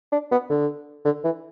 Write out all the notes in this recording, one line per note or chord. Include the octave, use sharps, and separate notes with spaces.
D4
B3
D3
D3
E3